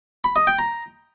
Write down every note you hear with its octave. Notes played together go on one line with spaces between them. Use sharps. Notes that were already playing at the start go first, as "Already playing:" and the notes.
B5
D#5
G5
A#5